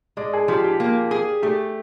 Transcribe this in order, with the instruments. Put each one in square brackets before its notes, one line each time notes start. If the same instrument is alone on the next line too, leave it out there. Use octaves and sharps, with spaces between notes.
[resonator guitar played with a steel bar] G#3 [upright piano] D5
[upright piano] G#4
[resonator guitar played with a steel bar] F3 [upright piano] G4
[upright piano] G4
[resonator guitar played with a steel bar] A#3
G#4
[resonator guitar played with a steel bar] A3 [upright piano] G4